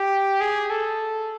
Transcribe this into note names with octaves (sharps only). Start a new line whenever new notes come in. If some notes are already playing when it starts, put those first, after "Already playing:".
Already playing: G4
G#4
A4